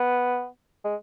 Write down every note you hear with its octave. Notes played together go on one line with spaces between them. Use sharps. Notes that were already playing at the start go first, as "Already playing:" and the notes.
Already playing: B3
G#3